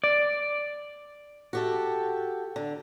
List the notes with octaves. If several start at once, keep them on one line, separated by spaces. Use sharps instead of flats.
D5
F#4 G4 A4
D3